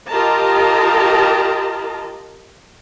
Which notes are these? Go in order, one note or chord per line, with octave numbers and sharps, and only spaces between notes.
F4 G4 A#4 D#5 A5 A#5